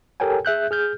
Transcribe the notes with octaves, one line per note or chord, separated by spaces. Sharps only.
G4 A4 A#4 C#5 G5 G#5
G#4 E5 F#6 G6
G#4 F6 G6